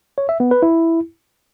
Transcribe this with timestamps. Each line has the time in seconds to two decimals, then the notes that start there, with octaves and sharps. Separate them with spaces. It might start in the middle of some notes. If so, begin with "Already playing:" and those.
0.18 C#5
0.29 E5
0.40 B3
0.51 B4
0.62 E4